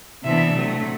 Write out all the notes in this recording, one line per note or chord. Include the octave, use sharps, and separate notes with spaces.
C3 E3 B3 D4 E5
C3 F#3 A3